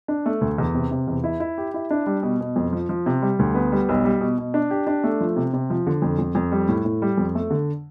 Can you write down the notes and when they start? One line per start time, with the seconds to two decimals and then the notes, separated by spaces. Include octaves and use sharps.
0.08 D4
0.26 A3
0.41 D2
0.58 E2
0.74 C3
0.91 C3
1.08 E2
1.24 E4
1.40 E4
1.58 G4
1.74 E4
1.91 D4
2.06 G3
2.23 B2
2.40 B2
2.56 F2
2.73 F3
2.89 F3
3.06 C3
3.22 G3
3.39 D2
3.55 B3
3.72 G3
3.89 B1
4.05 G3
4.21 B2
4.38 B2
4.54 D4
4.71 G4
4.87 D4
5.04 A3
5.21 F3
5.36 C3
5.53 C3
5.70 F3
5.87 D3
6.02 F2
6.18 F2
6.35 F2
6.52 G3
6.68 A2
6.85 A2
7.02 G3
7.17 F2
7.35 A3
7.50 D3